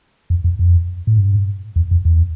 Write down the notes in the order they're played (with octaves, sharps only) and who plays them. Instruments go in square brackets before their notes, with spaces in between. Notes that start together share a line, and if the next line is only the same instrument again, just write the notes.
[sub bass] F2
F2
F2
A2
G2
E2
F2
E2